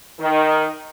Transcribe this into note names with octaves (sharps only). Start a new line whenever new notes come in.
D#3